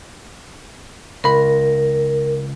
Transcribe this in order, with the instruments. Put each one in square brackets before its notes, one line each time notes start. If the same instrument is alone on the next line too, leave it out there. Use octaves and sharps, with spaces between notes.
[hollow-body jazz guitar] C#2 B5 [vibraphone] A#4